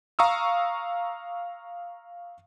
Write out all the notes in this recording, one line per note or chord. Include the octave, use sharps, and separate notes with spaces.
F5 A#5 C#6 D#6 E6